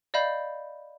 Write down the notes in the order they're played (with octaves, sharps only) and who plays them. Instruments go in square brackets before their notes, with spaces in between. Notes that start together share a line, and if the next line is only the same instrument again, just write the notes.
[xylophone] D5 D#5 F5 B5 G6